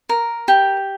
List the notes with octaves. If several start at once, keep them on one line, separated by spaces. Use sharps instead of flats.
A#4
G4